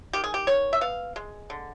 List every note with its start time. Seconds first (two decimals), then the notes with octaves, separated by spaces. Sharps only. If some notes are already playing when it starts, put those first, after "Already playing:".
0.13 D#3 G4
0.24 G#4
0.34 G4
0.47 D#3 C#5
0.73 E5
0.81 B3 F5
1.16 G#3
1.50 D3